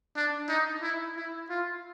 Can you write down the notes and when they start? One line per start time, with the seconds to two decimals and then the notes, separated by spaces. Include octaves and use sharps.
0.16 D4
0.49 D#4
0.82 E4
1.17 E4
1.50 F4